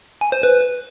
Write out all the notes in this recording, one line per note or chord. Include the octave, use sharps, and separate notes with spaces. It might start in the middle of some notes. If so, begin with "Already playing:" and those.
G#5
C5
B4